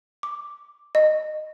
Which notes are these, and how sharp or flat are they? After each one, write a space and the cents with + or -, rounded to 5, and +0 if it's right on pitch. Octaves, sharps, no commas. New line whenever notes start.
D6 +0
D#5 -15